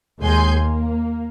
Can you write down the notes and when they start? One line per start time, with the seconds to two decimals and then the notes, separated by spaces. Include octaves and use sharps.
0.21 D#2 G#3 G#5 C6 G6
0.57 A#3